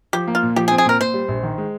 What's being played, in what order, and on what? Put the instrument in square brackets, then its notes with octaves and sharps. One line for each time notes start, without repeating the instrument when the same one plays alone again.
[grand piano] F3 [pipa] G4
[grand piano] A#3
[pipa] F4
[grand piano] A#2
[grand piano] F3 [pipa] G4
[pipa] G#4
[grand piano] C4
[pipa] G#4
[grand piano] A#2 [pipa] A#4
[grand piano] A#2 [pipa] C5
[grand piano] G3
A#1
D#3
G#3